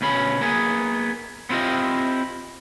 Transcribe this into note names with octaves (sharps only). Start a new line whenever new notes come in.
D2 B2 C#4 B5
A#3 B3 G#4
B3 C4 E4 F4 G4 D#5